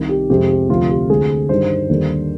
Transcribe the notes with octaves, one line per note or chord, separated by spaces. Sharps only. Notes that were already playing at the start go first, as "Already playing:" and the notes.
Already playing: C2 C3 D#3
G4
F2 C3 F3 G#3 C4 G4
G4
D2 C3 F3 C4 F4
G4
D2 D3 G#3 C4 G#4
G2 D#3 G3 C5
D#2 D3 G3